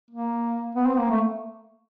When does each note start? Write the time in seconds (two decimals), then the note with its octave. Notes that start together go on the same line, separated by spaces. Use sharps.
0.10 A#3
0.75 B3
0.86 C4
0.99 A#3
1.10 A3